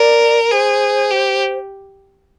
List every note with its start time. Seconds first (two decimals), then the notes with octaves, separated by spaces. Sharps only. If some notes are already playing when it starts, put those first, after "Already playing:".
Already playing: A#4 D5
0.51 G#4 C5
1.11 G4